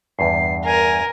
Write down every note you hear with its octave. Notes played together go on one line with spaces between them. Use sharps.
E2 G2 C7
A#4 G#5